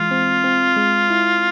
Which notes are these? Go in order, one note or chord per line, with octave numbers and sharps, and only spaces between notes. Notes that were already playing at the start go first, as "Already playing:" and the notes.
Already playing: E3 G#3 F4
C4
C4
G#3
E4